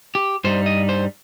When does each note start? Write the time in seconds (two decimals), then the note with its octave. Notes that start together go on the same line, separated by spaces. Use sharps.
0.15 G4
0.44 G2 G3 D#4 C5
0.66 D#5
0.89 C5